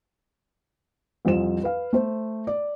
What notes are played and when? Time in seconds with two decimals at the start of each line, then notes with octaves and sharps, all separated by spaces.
1.25 C2 F2 F3 C5 E7
1.63 B4 F5
1.93 A3 C5
2.47 D5